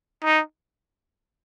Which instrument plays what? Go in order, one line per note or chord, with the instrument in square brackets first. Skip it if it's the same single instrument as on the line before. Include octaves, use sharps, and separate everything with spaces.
[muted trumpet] D#4